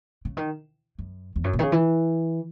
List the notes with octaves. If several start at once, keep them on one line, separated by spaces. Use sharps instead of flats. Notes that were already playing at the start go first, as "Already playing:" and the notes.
C#3
D#3
F#2
E2
F#2
B2
D#3
C#3
E3